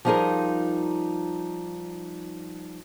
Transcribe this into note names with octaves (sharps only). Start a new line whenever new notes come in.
F3 G3 D#4 F4 G#4 A#4